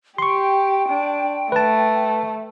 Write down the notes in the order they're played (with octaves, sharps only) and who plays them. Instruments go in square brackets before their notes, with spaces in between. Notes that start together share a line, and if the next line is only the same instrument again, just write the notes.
[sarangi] G4 [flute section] G5 [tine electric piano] C6 C#6
[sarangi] D4
[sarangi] A3 [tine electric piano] B4 A5